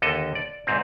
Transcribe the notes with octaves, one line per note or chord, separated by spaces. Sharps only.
D#2 D3 A4 D#5
D5
D2 G#2 C4